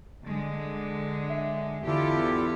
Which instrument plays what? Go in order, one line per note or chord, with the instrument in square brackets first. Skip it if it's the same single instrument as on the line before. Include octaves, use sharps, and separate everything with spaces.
[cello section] D3 G#3 [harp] A6
[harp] E5
[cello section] E2 G4 [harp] D3 [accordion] E4 F4 A4